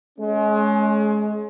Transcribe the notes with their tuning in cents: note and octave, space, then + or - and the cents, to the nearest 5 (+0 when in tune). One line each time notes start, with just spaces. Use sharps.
G#3 +30 C#4 +0